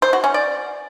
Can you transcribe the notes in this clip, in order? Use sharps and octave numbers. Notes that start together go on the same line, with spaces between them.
C5
F#4
C#4
D5